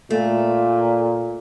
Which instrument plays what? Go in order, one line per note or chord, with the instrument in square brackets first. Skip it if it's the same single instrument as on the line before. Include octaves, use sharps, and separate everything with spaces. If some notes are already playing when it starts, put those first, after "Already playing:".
[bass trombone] A#2 [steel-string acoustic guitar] A3